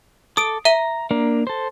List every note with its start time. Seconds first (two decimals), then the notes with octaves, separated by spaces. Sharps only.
0.37 A4 D6 D#6 D7
0.65 E5 A#5 D#7 G7
1.11 A#3 D4 A#4
1.47 A4 C5